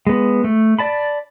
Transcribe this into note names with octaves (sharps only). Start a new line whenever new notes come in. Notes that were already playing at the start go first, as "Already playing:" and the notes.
G#3 B3
A3
D5 A5 B5